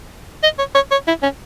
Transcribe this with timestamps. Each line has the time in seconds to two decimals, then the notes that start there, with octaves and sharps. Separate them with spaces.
0.43 D#5
0.59 C#5
0.75 C#5
0.91 C#5
1.08 E4
1.23 C#4